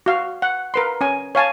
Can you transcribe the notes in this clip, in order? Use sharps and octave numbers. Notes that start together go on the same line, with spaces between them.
F#4 F5
F#5
A#4 B4 C6
C#4 G#5
C#5 F5 G#5 A5